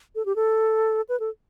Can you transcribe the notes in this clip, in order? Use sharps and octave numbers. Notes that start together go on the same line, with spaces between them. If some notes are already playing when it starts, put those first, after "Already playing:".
A4
G4
A4
B4
A4